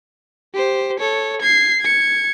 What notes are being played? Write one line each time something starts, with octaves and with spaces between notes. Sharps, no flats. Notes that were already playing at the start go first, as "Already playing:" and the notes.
G4 C5
A4 C#5
G#6 C7
G#6 C#7